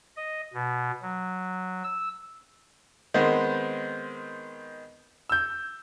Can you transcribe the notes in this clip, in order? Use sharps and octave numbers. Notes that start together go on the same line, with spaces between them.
D#5
B2
F#3
E6
D#3 G#3 B3 C4
E6 G6